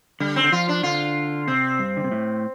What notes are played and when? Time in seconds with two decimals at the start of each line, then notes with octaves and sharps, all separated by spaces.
0.20 D3 G3
0.36 C4
0.44 D3
0.52 F3 F4
0.68 D4
0.83 D3 F4
1.47 C3 C4
1.79 G2
1.97 D3
2.04 C3
2.11 A2